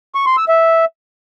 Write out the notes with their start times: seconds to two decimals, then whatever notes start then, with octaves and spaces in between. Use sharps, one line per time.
0.15 C#6
0.26 C6
0.37 E6
0.49 E5